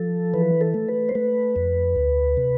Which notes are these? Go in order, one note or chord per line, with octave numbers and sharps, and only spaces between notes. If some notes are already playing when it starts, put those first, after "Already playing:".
Already playing: F3 A4
E3 B4
A4
A3
B4
C5
A3 B4
F2
D2
C3